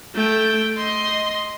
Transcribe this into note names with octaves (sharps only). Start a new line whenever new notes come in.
A3 G5
D#5 C6